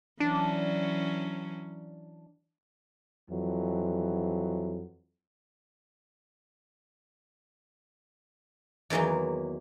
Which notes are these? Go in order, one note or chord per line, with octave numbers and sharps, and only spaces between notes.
E3 F#3 C#4 D4
F2 E3 F#3
E2 D#3 E3 F#3 A#3